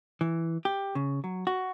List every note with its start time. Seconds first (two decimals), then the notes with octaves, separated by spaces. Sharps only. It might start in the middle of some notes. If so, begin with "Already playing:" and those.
0.21 E3
0.65 G4
0.95 C#3
1.24 F#3
1.47 F#4